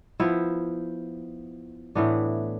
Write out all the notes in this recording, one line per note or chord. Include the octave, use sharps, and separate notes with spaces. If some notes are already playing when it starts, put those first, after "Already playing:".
F3 B3 E4
A2 E3 B3 D4